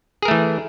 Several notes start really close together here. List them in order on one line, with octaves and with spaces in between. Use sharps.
G#4 A#4 A3 E3